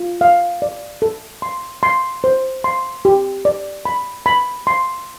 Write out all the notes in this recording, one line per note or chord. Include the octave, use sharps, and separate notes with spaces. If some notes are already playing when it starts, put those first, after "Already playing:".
Already playing: F4
F5
D5
A4
C6
C6
C5
C6
G4
D5
B5
B5
C6